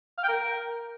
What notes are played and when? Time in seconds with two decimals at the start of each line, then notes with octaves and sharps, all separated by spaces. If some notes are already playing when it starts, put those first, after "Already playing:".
0.18 F5
0.23 G5
0.29 A#4